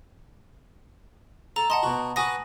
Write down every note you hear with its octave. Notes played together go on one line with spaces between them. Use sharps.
A4 A#5
D#5 F#5 A5 C6
B2 F#4
F#4 B4 F#5 G#5 D#6 A#6